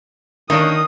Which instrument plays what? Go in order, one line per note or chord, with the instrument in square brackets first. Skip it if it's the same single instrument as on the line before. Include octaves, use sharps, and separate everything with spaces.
[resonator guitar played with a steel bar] D#3 [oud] A#3 C#4 D4 [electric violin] D#6